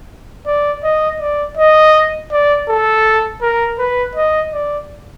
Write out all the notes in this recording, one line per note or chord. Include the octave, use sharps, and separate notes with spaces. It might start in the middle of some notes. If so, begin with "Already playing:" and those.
D5
D#5
D5
D#5
D5
A4
A#4
B4
D#5
D5